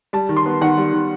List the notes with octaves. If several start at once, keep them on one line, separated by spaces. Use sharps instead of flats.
G3 A5
D#3
C6
B3
D#3 F#5
G3
D#3